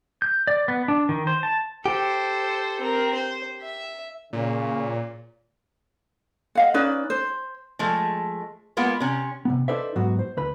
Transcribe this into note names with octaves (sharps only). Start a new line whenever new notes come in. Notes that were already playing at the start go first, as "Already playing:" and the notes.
G6
D5
B3
D4
D#3
C5
A5
G4 A4 C5
C4 A#4
C5
E5
A#2 C#3
D#5 F5 F#5
C#4 D#4 B4 D5
C5
F3 G#3 A3
G#3 A#3 B3 F4
C3 C#4
C3 B3
D#4 A4 B4 C5 D5 E5
G#2 F#3 B3 F#4
C5
D2 B4 B5